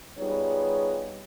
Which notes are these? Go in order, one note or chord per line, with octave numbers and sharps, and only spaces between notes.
G3 B3 D#4 F4 G#4 C#5